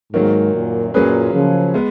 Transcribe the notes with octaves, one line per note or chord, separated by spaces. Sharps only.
G#2 D#3 F#3 A#3
F#2 A#2
F#2 A#2 F#3 A#3 C#4 G#4 B4
C#3 F3
G#3 B3